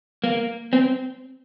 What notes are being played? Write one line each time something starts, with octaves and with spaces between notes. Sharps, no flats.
A#3
C4